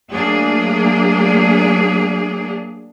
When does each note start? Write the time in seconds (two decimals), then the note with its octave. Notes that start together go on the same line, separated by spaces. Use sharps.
0.12 F#3 A3 A#3 D4 G#4